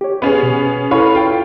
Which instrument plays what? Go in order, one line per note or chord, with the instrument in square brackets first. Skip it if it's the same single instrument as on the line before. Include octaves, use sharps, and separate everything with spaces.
[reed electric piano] G4 C#5
[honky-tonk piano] B3 C#4 G#4
[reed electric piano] B2
[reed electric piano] E4 A4 B5 [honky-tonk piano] B4 C#5 F5
[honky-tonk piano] F4 G5